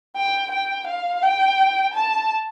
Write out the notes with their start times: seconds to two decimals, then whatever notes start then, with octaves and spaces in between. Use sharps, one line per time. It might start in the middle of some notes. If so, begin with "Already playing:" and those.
0.16 G5
0.51 G5
0.87 F5
1.22 G5
1.94 A5